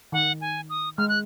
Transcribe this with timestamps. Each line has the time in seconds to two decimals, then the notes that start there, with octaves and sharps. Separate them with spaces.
0.12 D#3 F#5
0.41 G#5
0.70 D#6
0.98 G#3 F6
1.09 F#6